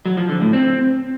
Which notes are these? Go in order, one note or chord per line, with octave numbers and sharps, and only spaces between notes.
F#3
F3
D3
A2
C4